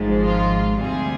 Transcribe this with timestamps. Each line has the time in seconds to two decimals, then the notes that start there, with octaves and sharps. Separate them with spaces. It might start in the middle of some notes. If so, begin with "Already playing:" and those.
Already playing: G#1 G#2 F3 G#3
0.21 F4
0.79 D2 C3 G3 G#4